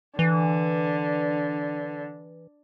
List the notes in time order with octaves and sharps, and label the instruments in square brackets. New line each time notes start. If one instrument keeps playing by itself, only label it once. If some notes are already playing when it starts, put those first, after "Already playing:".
[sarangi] D3 [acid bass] E3